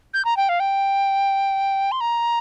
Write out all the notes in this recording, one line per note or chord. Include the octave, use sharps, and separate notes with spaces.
G6
A#5
G5
F5
G5
C6
A#5